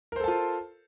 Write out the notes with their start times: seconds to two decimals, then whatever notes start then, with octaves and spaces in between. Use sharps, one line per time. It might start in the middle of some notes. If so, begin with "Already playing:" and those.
0.12 A#4
0.16 C5
0.20 A4
0.24 A5
0.28 F4